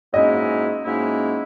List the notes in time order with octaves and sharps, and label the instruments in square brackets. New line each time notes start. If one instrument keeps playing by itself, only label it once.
[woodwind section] G#2 F#3 A#3 C#4 E4 [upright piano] D#5
[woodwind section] G#2 F#3 A#3 C#4 E4